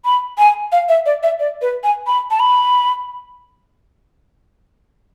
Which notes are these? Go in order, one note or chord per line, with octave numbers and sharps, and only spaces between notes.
B5
G#5
F5
E5
D5
E5
D5
B4
G#5
B5
A5
B5